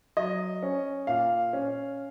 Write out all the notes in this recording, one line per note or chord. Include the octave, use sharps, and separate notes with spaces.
F#3 D#5
C#4
A#2 F5
C#4